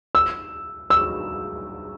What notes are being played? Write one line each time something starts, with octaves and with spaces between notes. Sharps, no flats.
E6
E6